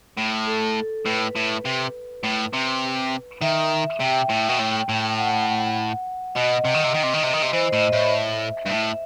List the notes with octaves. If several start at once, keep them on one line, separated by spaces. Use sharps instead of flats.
A2
A4
A2 B4
A2
C3
A2
C3
D#3 E5
C3 G5
A2
B2
A2
A2
F#5
B2 D#5
C3
D#3
C3
D#3
C3
D#3
C3
D#3
C3
E3 C5
A2 D#5
A2 E5
G2
A2 E5